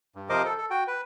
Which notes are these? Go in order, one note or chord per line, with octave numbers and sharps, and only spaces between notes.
G2
C3 F3 A#4 C5 D#5 D6
A4
A4
F#4 G5
B4